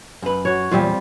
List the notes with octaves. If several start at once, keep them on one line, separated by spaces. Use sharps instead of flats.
F#2 B4
F#4 C#5
E2 A#2 G3 C4 F4